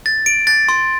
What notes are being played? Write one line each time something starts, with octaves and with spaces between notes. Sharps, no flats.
A6
D7
A6
C6